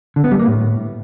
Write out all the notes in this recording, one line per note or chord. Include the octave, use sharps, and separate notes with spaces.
D3
B3
G3
A#3
A2